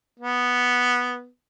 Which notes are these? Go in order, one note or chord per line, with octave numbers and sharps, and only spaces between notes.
B3